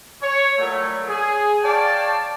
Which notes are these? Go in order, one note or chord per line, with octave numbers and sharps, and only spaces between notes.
C#5
A#2 F#3 G3 A3
G#4
C#5 D5 F5 G5 A5